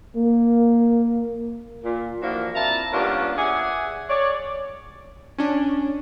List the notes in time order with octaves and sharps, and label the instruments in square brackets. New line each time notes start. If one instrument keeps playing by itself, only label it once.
[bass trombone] A#3
[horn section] A#2
E3 F3 A#3 D4 F#4 A#4
C4 E4 F4 A5 A#5
G3 A#3 B3 C#4 D4 F4
G#4 D5 E5 F#5 G#5
C#5 D5
[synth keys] C#4 D4